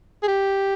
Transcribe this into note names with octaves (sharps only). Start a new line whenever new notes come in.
G#4
G4